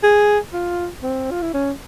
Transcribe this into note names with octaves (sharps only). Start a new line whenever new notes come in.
G#4
F4
C4
F4
E4
C#4